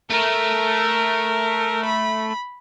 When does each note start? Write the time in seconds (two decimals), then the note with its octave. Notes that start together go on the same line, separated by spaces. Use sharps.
0.10 A3 A#4
1.86 B5